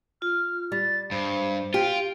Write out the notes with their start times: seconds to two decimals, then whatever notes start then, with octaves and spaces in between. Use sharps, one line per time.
0.22 F4 F6
0.72 G3 A6
1.11 G2 C5 B5
1.74 F4 G4 D7